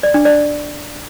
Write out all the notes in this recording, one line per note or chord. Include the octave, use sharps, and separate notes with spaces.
D5
D4
D5